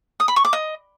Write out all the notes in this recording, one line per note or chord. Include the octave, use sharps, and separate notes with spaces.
D#6
B5
C#6
D6
D#5